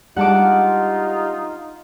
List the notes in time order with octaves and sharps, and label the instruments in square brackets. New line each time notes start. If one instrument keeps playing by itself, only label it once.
[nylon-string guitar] G3 G#3 D4 [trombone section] D#4 F4 [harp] F#5 A5 D6